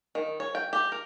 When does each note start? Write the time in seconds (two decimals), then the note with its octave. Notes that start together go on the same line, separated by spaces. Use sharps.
0.15 D#3
0.40 C#5
0.55 G5
0.73 G4
0.92 A#4